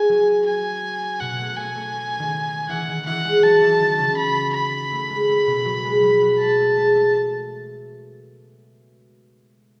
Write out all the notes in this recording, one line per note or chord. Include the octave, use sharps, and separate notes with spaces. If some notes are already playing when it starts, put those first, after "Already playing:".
Already playing: E4 G#4 G#5
F#3 F#4
G#5
B2 B3 F#5
A3
A3 G#5
A3
D#3 D#4
E3 E4 F#5
D#3 D#4
E3 E4 F#5
G#3 G#4
F#3 F#4 A5
E3 E4
D#3 D#4
C#3 C#4
B5
B5
A3
G#3
A3
B2 B3
F#3 F#4
G#3 G#4
F#3 F#4
F#3 F#4
G#3 A5
A3
G#3
A3